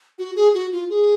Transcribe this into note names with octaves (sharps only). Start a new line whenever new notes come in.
F#4
G#4
F#4
F4
G#4